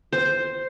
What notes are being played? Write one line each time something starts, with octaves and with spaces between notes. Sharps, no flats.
C5